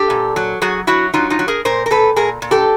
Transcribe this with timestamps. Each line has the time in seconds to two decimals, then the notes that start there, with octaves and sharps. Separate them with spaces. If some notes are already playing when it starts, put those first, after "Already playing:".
Already playing: G4 A4
0.10 A#2
0.36 F#3
0.62 F#3 F#4 G#4
0.87 F#3 E4 F#4
1.14 F#3 D#4 F4
1.30 D#4 F4
1.39 F#3
1.48 G#4 A#4
1.65 A#2 A#4 C5
1.86 A#4
1.90 A#2 A4 B4
2.16 A#2 G#4 A#4
2.42 A#2
2.51 G4 A4